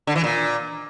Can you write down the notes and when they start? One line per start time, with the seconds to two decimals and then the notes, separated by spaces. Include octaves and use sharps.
0.07 D3
0.15 E3
0.24 A#2